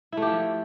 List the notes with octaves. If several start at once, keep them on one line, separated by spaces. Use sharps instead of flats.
F3 A3 E4 G4